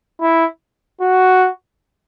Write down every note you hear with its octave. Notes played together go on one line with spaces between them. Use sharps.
E4
F#4